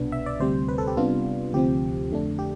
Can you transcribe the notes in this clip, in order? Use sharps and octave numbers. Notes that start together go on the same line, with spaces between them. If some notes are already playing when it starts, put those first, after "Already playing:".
Already playing: C2 B2 B3 D4
E5
D5
D2 C3 G3 C4 C5
B4
A4
G4
C3 G3 B3 D4 F4
D2 C3 F3 C4 G4
F2 D3 A3 D4
G4